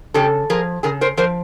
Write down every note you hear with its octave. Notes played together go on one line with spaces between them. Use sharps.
C#3 G4 A4
F3 G#4 A#4
C#3 G#4 A#4
A#4 C5
F3 A#4 C5